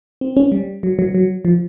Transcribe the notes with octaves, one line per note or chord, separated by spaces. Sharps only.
C4
C#4
G3
F#3
F#3
F#3
F3